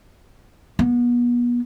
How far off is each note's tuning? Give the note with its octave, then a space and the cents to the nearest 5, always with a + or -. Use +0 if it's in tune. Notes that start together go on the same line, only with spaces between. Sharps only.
B3 -35